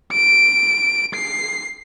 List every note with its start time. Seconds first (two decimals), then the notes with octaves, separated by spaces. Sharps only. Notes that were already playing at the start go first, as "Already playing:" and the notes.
0.12 D7
1.14 C7